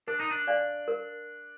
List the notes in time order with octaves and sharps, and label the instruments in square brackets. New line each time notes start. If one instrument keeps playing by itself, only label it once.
[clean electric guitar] D4 [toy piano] A#4
[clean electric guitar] D#4
D4
[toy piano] D5 F5 G#5
A#4